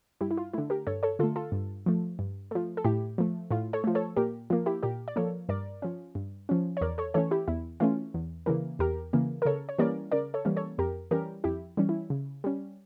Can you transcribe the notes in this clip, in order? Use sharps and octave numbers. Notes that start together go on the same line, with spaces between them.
G2 E4 G4
E4
F4
D3 A3 E4
G4 A#4
G2 A4 C#5
A4 C#5
D3 A3 F4 A4
F4 A4
G2
F3 A3
G2
F3 A3
A4
A2 E4 G4
F3 A3
A2 F4
A4 C#5
F3 A3
A4 C#5
A#2 G4 A#4
F3 A#3 F4
E4 G4
A#2 G4 A#4
D5
F3 A#3 A4 C#5
G2 A#4 D5
F3 C#4
G2
F3 C#4
C#5
E2 A#4 D5
A4 C#5
E3 A3 C#4 A4 C#5
E4 G4
E2 E4
E3 A3 C#4 F4
E2
C#3 E3 A#3
E2 G4 A#4
C#3 E3 A#3
A#4
C#3 A4 C#5
C#5
E3 G3 A#3 C#4 A#4 D5
C#3 A#4 D5
A4 C#5
E3 G3 A#3 C#4
A4 C#5
F2 G4 A#4
E3 G3 C#4 G4 A#4
F2 E4 G4
E3 G3 C#4
E4
C#3
G3 C#4